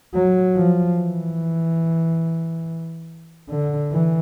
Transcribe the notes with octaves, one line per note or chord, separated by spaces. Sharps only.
F#3
F3
E3
D3
E3